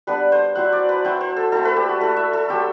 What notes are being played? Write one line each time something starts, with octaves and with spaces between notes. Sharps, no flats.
G3 B3 D4 B4
C5
F#3 C4 E4 F#5
D5
B4
F#3 C4 E4 C5
C5
A4
A3 C4 E4 A4
B4
G4
F#4
A3 E4 A4
E5
A4
F#3 A3 C4 G4